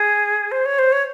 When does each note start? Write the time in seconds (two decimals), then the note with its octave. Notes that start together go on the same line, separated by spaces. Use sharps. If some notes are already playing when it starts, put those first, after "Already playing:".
Already playing: G#4
0.51 C5
0.65 C#5
0.78 C5
0.92 C#5